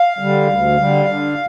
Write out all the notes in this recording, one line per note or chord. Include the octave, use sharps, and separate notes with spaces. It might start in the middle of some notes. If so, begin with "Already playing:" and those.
Already playing: F5
D3 G3
D2
D3 G3
D3